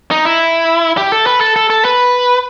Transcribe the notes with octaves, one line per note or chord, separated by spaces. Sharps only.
D#4
E4
G4
A4
B4
A4
A4
A4
B4